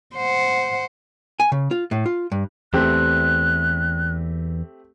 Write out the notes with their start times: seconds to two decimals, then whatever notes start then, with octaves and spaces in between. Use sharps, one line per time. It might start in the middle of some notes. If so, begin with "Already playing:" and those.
0.16 C5 F#5
1.40 G#5
1.52 C#3
1.71 F4
1.91 A2
2.06 F4
2.32 G2
2.74 E2 A3 C4 G4 F#6